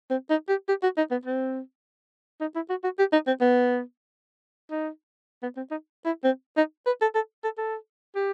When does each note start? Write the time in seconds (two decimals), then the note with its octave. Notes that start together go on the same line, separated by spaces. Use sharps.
0.10 C4
0.30 D#4
0.49 G4
0.69 G4
0.83 F#4
0.98 D#4
1.11 B3
1.25 C4
2.41 D#4
2.55 E4
2.70 F#4
2.84 F#4
2.99 G4
3.13 D#4
3.27 C4
3.41 B3
4.71 D#4
5.43 B3
5.57 C4
5.71 D#4
6.05 E4
6.24 C4
6.57 D#4
6.86 B4
7.01 A4
7.15 A4
7.44 A4
7.58 A4
8.16 G4